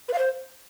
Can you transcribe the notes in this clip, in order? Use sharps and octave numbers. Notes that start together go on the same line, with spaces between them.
B4
F5
C5